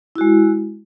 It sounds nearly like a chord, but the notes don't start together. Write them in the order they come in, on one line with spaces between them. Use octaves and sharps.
E4 F#4 G#3